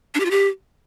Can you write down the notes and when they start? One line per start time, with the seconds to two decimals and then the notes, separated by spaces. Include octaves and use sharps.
0.15 D4
0.20 G4
0.25 F4
0.31 G4